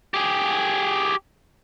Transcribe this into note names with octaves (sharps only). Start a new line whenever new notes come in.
G4 G#4